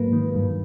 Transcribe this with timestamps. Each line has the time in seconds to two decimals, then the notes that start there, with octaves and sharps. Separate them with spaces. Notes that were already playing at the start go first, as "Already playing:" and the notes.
Already playing: G#2 F#3 A#3 B4
0.13 D#3
0.35 G2